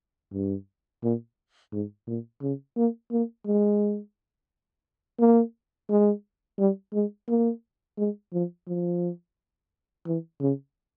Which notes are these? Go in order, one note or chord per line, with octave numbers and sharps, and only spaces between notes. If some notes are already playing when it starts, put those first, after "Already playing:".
G2
A#2
G#2
A#2
C#3
A#3
A#3
G#3
A#3
G#3
G3
G#3
A#3
G#3
F3
F3
E3
C#3